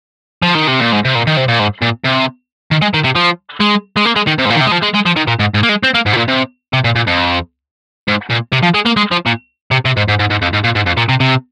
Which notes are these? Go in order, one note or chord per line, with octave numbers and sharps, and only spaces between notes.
F3
D#3
C3
A#2
G#2
C3
A#2
D#3
C3
A#2
G#2
A#2
C3
D#3
G#3
D#3
C3
F3
G#3
G#3
A#3
G#3
D#3
C3
G#2
A#2
D#3
C3
G#3
F3
G#3
G#3
F3
D#3
A#2
G#2
G#2
A#3
G#3
C4
A#3
G#2
C3
A#2
C3
C3
A#2
A#2
F2
G#2
A#2
C3
F3
G#3
A#3
G#3
F3
A#2
C3
C3
G#2
G#2
G#2
G#2
F2
G#2
A#2
G#2
F2
A#2
C3
C3